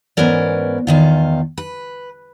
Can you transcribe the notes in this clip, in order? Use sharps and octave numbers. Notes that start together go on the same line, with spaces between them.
G#2 E3 B3 C#4 A#4 D5
E2 D#3 F4
B4